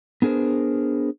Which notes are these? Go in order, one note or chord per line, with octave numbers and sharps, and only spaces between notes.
B3 D4 G#4 A#4 C5